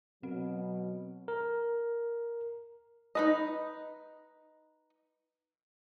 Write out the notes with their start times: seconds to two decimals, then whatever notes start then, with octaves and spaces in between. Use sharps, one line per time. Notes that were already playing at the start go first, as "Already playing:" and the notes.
0.23 B2 F#3 C4
1.28 A#4
3.15 D#4 B4 D#5